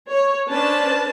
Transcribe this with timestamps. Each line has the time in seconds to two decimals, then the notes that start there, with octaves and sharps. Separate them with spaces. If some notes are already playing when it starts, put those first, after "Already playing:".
0.11 C#5
0.50 C#4 D4 B4 C5 A5